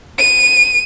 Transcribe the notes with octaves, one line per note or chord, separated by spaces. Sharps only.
D#7